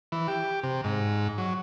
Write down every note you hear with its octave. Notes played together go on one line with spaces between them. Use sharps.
E3
G4
C3
G#2
F#3